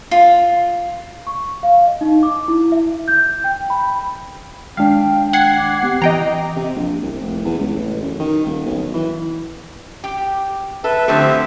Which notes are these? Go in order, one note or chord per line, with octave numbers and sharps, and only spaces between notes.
F4
C#6
F5
D#5
D#4
D6
E4
E5
G6
G5
B5
D#3 G#3 D4 F5 G5
F#5 G#6 C7
D6
B3 C4 G4
E3 D#5 G5 A#5
C3
A#1
C2
F1
E2
C#2
A1
F#2
D#3
D#1
B1
E3
G4
A4 B4 E5
D3 F3 A3 C4 G4 E5